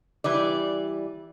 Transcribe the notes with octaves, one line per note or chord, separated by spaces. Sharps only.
E3 G3 D5